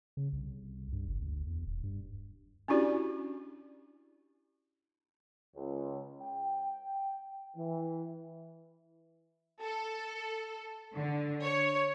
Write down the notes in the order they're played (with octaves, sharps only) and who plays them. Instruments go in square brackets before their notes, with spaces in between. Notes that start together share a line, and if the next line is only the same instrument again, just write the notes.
[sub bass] C#3
C2
G2
F#1
D2
E2
D#1
G2
[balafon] C#4 D4 E4 F#4 G4 D5
[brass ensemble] C#2
G5
E3
[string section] A4
D3
C#5